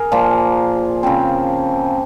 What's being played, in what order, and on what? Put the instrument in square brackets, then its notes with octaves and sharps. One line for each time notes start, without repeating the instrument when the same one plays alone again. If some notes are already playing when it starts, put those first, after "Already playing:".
Already playing: [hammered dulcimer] G#4 A#4
A#2 F3 A#3
C#3 F3 C4